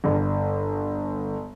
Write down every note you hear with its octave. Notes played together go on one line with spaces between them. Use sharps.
G1